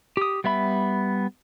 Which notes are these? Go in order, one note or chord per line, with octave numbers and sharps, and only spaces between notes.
G4 D#6
G3 B3 E5 B5